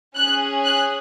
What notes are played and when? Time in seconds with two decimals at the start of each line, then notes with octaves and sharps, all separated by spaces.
0.16 C#4 G#4 F#6
0.64 F#6